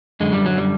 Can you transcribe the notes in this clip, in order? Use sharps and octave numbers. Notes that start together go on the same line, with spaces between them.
F#2 D3 G#3
G3
F#3
G3